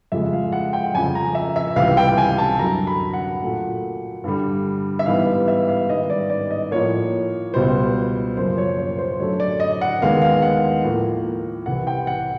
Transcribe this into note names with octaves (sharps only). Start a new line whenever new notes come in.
F2 C#3 F3 G#3 E5
F5
F#5
G5
F2 C#3 F3 G#5
A#5
E5
E5
C#2 C3 E3 G3 F5
G5
G#5
A5
F#2 D3 F#3 A#5
B5
F#5
A#2 F#3 A3
G2 D3 G3
E5
G#2 E3 G3 B3 F5
E5
F5
G#2 D#3 G3 B3 D#5
D5
D5
D#5
A2 F3 A#3 C#5
C#2 B2 G3 C5
F#2 C#3 F3 A#3 C5
C#5
C#5
C5
F#2 D3 F#3 A3 C#5
D5
D#5
F#5
D#2 D#3 G#3 B3 F5
F5
F#5
A2 F3 A#3
C2 C3 E3 F#5
G5
F#5